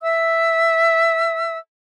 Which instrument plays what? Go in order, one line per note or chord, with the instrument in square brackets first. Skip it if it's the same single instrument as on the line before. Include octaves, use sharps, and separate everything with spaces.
[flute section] E5 E6